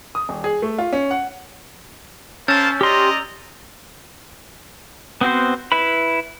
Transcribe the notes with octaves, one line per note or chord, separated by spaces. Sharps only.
D#6
D#1
G#4
A3
F4
C#4
F#5
A#3 C#4 C5 A5 E6 G6 A6
G4 D5 D#5 A#5 C6
B3 C4 F#4 C5
E4 B4 B5